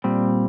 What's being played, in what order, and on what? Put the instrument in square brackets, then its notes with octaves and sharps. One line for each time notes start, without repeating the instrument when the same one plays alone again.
[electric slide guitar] A#2 G3 C4